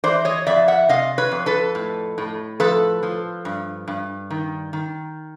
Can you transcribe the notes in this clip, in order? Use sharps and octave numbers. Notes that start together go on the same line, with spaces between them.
E3 C5 D5
C#5 D#5
F2 D5 E5
E5 F#5
C3 D#5 F5
B4 C#5
F2
A4 B4
A2
A2
F3 A4 B4
F3
G2
G2
D#3
D#3